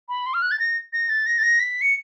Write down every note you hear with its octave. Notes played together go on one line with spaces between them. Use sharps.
B5
C6
F6
F#6
A6
A#6
A#6
A6
A#6
A6
A#6
B6
C#7